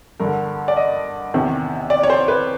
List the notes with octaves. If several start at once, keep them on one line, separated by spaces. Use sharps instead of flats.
G2 D3 A#4
D5
D#5
E2 C3 D#3
D5
C#5
C5
B4